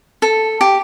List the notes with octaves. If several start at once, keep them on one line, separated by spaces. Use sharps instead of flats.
A4
G4